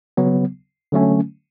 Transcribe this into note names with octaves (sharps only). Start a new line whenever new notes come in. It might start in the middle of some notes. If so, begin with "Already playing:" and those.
C#3 F#3 B3
D3 F#3 A3 C#4